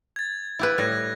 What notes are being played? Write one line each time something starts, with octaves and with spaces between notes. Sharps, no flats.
G#6 A6
E4 G4 B4
A2 G3 F#6 G#6 A#6